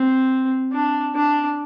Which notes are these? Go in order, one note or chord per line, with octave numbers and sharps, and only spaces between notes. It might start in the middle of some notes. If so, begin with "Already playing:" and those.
Already playing: C4
D4
D4